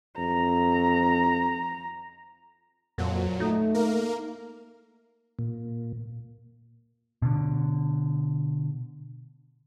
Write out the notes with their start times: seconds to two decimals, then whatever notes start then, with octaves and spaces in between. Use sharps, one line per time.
0.18 F2 A#5
2.98 F2 A#2 F#3
3.40 A3 D#4
3.74 A#3 A#4
5.39 A#2
7.22 B2 D3